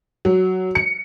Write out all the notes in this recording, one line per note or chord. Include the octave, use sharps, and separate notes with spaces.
F#3
C#7